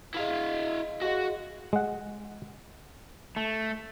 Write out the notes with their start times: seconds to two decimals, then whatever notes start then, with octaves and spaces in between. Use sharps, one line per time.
0.14 G#3 E4 F5 A#5 D#6
0.60 E6
1.02 G#3 F#4 F5
1.73 G#3 F#5
3.36 A3